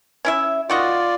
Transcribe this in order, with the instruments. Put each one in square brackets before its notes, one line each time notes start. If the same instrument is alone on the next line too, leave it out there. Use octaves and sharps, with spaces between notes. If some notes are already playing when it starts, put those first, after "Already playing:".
[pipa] C#4 E4 E5
[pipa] D#3 F#4 D#5 [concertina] F4 D5